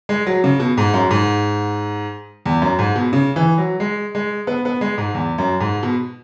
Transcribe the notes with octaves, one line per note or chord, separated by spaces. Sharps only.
G#3
F#3
C#3
B2
G#2
F#2
G#2
E2
F#2
G#2
B2
C#3
E3
F#3
G#3
G#3
B3
B3
G#3
G#2
E2
F#2
G#2
B2